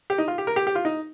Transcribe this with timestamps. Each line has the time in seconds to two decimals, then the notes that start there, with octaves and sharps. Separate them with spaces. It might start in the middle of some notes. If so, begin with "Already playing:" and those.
0.10 G4
0.18 D#4
0.28 F4
0.38 G4
0.47 A#4
0.56 G4
0.67 G4
0.75 F4
0.85 D#4